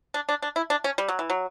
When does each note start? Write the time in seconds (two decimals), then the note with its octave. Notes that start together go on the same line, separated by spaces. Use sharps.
0.14 D4
0.29 D4
0.42 D4
0.56 E4
0.70 D4
0.84 C#4
0.98 G3
1.08 F#3
1.19 E3
1.30 F#3